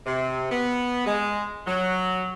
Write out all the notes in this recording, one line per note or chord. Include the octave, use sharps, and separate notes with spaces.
C3
B3
G#3
F#3